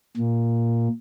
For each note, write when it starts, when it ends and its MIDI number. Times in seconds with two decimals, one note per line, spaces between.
0.17 0.88 46